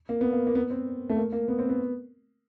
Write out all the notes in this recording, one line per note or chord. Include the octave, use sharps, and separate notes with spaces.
A#3
B3
A#3
A#3
B3
C4
A3
A#3
A#3
B3
C4
B3